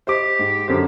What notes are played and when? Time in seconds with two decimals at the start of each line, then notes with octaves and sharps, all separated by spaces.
0.07 G4 C5 D#5 D6
0.39 G#2
0.68 F#2 D3 C5